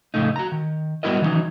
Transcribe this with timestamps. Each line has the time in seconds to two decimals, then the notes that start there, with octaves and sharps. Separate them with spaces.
0.14 F2 A2 C#3 A3 D#4
0.36 F#4 A#5
0.52 D#3
1.03 G3 B3 E4 F#4 A#4 D#5
1.21 D#3 E3 F#3 G3 C#4 D#4